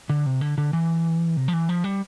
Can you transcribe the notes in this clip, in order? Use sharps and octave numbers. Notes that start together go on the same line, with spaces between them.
D3
C3
D3
D3
E3
C3
F3
E3
F3
G3